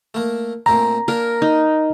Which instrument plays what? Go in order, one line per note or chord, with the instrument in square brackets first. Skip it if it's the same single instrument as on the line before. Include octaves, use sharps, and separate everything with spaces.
[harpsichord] A3 A#3
[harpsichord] A#2 A3 C4 [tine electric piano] A#5
[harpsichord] A#3 D4 [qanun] A#4
[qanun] D#4